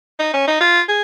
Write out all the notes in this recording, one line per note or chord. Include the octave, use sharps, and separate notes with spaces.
D#4
C#4
D#4
F4
G#4